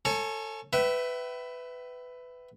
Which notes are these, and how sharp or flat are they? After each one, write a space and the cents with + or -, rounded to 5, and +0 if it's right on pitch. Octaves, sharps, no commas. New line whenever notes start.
A4 +25 C#5 -20 G#5 +35
B4 +15 E5 +0 G5 -40